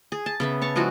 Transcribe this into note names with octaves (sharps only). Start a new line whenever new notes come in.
G#4
A5
C#3 B3 E5
C#5 A5 C#6
F3 G#3 E4 F#4